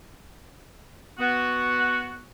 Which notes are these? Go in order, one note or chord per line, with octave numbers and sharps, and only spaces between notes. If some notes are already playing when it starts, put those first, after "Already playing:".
B3 F#4